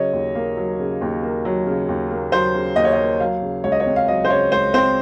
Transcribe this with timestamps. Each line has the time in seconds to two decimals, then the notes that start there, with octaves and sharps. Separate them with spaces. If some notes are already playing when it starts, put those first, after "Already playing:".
Already playing: C#3 F#3 C#5 D#5
0.13 D#2
0.35 A#3
0.57 F#3
0.79 C#3
1.01 D#2
1.23 A#3
1.45 F#3
1.67 C#3
1.89 D#2
2.11 A#3
2.32 F#3 C5
2.54 C#3
2.76 D#2 D#5
2.85 C#5
2.93 D#5
2.98 A#3
3.20 F#3 F5
3.42 C#3
3.64 C#2 C#5
3.72 D#5
3.80 C#5
3.86 C4
3.96 F5
4.08 F#3 D#5
4.25 C5
4.30 C#3 C#5
4.52 C#2 C5
4.74 C4 C5